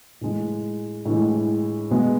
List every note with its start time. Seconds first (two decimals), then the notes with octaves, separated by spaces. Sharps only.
0.21 A2 E3 G#3
1.05 A2 E3 G#3
1.90 B2 G#3 B3